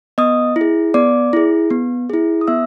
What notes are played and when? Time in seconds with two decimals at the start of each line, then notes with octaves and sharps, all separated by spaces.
0.18 B3 D#5 D#6
0.56 E4
0.61 G#4
0.94 B3 D5 D6
1.33 E4 G#4
1.70 B3
2.10 E4 G#4
2.41 D#6
2.48 B3 E5 E6